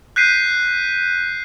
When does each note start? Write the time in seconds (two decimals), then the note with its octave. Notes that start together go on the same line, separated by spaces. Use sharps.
0.16 F#6 G6 B6 C7 D#7